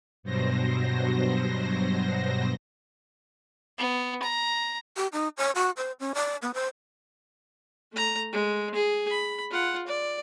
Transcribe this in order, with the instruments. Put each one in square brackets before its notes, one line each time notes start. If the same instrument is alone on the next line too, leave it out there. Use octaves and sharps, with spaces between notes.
[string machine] G2 B2 F#3 C5 A#6
[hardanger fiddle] B3
A#5
[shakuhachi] G4
D#4
C#5
F#4
C5
C#4
D5
B3
C5
[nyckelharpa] A3 A#5
G#3
G#4
B5
F4 F#5
D5